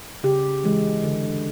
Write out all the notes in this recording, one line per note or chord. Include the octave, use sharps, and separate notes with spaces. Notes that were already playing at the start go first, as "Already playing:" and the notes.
C#3 G4
E3 G#3
D3